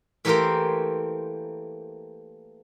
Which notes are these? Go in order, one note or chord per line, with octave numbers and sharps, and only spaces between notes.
E3 A3 A#3 G4 A#4 C5